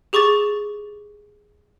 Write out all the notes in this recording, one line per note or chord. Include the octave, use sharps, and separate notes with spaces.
G4 G#4 C#6 D6 A6